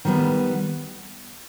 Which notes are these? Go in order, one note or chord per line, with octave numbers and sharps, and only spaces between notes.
D#3 G3 B3